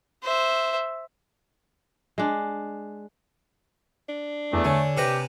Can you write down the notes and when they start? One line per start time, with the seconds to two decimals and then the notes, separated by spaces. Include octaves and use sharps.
0.23 C5 E5
2.18 G#3 D4
4.09 D4
4.53 E2 A3
4.65 D3 C#5 G#5
4.97 C3 G4 B4 A#5